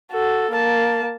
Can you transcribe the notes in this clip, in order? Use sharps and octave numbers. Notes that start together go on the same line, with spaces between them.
F#4 A4
A#3 A5